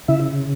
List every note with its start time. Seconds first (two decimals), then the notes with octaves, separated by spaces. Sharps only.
0.08 C#3 E4 E5